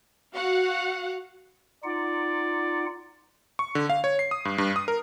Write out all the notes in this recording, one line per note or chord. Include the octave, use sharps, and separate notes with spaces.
F#4 F5 F#5
D#4 F4 D5 F#5
C#6
D3
F5
C#5
C7
D#6
G2
G2
D#6
A#4